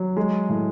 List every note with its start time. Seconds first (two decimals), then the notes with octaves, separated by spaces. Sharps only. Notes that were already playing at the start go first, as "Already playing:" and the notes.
Already playing: F#3
0.17 G#3
0.49 A2